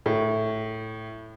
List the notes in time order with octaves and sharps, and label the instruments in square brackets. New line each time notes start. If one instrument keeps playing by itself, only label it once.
[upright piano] A2